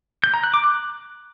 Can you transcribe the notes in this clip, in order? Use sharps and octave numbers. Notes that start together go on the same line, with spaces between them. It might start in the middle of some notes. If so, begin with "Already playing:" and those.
G6
A#5
F#6
D6
F#6